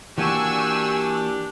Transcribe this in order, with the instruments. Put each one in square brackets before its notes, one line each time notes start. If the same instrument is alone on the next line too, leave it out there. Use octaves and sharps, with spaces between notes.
[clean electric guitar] E3 A#3 F#4 [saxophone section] D4 G4 [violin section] G#5 C#6 E6